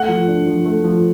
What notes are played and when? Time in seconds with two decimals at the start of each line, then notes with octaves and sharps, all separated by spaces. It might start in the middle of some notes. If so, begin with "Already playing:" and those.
Already playing: A3 F#5
0.08 F3
0.28 D4
0.47 F3
0.65 A3
0.84 F3